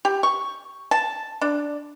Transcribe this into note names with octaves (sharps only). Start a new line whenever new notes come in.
G4
C#6
A5
D4